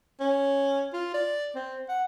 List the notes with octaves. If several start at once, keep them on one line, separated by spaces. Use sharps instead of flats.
C#4
F4
D5
C4
F#5